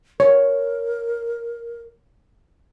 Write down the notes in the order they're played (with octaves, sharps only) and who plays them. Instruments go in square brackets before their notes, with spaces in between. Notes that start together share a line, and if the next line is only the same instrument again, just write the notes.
[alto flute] A#4 [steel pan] C#5